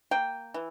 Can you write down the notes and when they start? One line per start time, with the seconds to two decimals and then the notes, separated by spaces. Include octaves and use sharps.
0.11 A#3 G5
0.54 E3